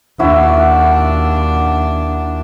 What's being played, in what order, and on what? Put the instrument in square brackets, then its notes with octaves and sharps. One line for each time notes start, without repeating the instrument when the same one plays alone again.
[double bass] D#2 D4 [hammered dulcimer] E4 F#4 E5